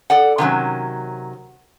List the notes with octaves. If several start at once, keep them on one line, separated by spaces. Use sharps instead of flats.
A4 D5 F#5
C3 D#3 F#3 C#4